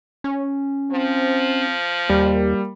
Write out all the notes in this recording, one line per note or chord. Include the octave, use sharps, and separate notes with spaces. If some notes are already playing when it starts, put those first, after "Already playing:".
C#4
F3 C4
D#2 G3 A#3